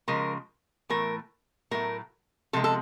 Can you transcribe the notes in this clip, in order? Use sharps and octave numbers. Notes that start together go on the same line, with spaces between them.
C#3 F3 G#3 A#4
A2 E3 A3 A#4
A2 F#3 A3 A#4
C3 F3 G#3 A4
A4